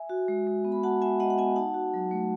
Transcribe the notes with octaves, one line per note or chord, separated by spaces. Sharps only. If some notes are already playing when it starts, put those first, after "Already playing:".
Already playing: E5 G#5
F#4
G#3
G#3
B3
B5
F#4 F#5 A5
G#3 E5 G#5
G#3 D#5 F#5
F#5
B3 E5 G#5
D#4 F#5 A5
F#4
F#3
A3